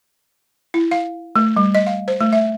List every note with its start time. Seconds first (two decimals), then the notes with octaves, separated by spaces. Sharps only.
0.74 E4
0.91 F5
1.36 A3
1.56 G3
1.75 D#5
1.87 F5
2.08 C5
2.21 A3
2.33 E5